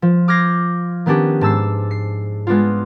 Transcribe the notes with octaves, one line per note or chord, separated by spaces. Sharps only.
F3
D6 F6 G6 G#6 A#6 C7
D#3 B3 C#4 D4 G4
G#2 A5 E6 C7
C7
G#3 B3 D4 F4